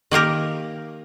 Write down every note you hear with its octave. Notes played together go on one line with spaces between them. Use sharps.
D#3 A#3 G4 A#4